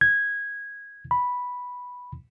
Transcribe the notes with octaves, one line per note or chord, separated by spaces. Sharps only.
G#6
B5